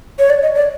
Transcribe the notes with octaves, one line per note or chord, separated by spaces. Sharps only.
C#5
D5
D#5
D5